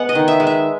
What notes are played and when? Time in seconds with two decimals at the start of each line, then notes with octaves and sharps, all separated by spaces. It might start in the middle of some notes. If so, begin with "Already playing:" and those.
Already playing: G#3 B3 F#5
0.09 D#5
0.15 D#3
0.28 E5
0.40 G#3
0.47 E5